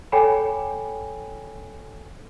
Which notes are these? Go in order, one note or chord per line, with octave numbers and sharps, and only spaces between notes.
A4 C#5 G5 G#5 B5